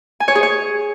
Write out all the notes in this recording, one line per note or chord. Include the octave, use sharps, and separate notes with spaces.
G#5
C#5
G#4
C#5